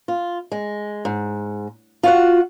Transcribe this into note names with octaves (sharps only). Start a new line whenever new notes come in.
F4
G#3
G#2
F4 F#4 F#5